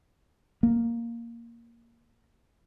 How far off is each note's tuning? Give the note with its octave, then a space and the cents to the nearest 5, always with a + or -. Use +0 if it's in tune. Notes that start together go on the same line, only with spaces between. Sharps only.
A#3 +0